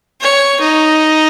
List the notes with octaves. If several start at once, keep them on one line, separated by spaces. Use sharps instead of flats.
C#5
D#4